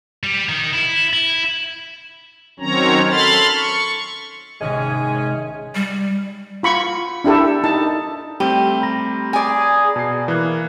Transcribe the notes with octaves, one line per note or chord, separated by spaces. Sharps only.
G3
D#3
E4
E4
D#3 F#3 C4 C#4 C#5 A#5
A4 B5 C6 F6 A6
C#6
G#1 C3 G#3 C#4 G#4
G3
F4 B5 C#6
D4 E4 G4 A4
D#4 A5
G3 A3 C4 G4 B5 D#7 G7
A#5 B5 A#6
G#4 D5 G#5
B2 A5 C7
E3 A#3 F#6